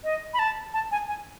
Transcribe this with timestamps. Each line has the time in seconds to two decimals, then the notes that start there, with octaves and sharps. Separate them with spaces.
0.04 D#5
0.34 B5
0.39 A5
0.73 A5
0.91 G#5
1.08 G#5